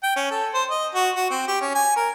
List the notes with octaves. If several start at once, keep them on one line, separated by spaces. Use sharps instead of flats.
G5
C#4
A4
C5
D#5
F#4
F#4
C4
G4
C#4
G#5
A#4